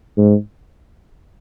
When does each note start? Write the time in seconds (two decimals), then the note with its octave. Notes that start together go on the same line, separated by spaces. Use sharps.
0.17 G#2